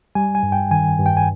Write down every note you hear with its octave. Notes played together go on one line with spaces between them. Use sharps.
G3 G#5
G#5
G2
G5
D#3 G#5
G2
G5
G#5